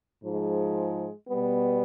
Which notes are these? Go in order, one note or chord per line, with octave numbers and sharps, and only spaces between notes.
G#2 F3 G#3
B2 G3 B3